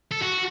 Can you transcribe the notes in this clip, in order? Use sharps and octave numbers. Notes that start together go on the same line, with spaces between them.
A4
F#4